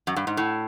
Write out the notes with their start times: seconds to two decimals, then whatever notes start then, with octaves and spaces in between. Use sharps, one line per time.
0.07 F#2
0.16 G2
0.27 G#2
0.37 A2